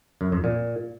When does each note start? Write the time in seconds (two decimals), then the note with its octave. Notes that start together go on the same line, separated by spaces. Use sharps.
0.21 F#2
0.32 F2
0.44 A#2